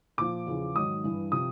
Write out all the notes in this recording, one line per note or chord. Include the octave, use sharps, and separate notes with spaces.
A#2 F3 D6
E2 C#3 F3
G#2 D#3 F#3 D#6
G2 E3
C3 F3 D#6